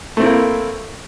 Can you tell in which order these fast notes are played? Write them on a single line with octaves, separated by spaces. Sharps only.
A3 C4 E4 A#3